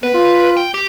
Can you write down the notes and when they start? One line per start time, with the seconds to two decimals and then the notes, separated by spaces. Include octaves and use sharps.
0.03 B3 B4
0.14 F4
0.57 G5
0.74 G4